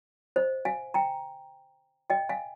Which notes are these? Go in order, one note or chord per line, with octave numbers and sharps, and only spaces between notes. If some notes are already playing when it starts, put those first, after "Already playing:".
C5 D#5
F5 G#5
G5 A#5
D#5 G5
F5 G#5